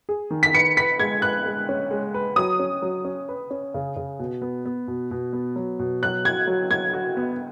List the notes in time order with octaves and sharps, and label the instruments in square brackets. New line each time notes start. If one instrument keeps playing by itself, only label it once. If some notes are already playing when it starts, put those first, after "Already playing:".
[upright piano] G#4
D#3
[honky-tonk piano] B6
[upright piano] B4 [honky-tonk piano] C#7
[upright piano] B4 [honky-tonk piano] B6
[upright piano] G#3 [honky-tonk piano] G#6
[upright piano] B4 [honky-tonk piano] F#6
[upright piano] G#3
C#4
G#3
B4
[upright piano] F#3 [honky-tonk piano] D#6
[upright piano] C#4
F#3
C#4
B4
C#4
C#3
C#3
B2
B3
B3
B2
B2
B3
F#3
B2
[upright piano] F#3 [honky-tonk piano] F#6
[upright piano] F#4 [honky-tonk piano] G#6
[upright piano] F#3
[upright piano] F#3 [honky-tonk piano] G#6
[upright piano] F#4
B3